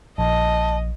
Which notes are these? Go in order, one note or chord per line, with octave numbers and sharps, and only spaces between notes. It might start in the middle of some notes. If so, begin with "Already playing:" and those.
A#1 D#5 A5